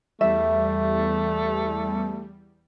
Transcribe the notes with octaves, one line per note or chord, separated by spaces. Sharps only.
E2 G3 A3 E5